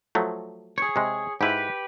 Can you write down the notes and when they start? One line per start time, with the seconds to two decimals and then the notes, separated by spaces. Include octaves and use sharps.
0.15 F3 F#3 A3
0.78 G#4 C#5
0.96 C3 G#3
1.41 G#2 E4 G4 B4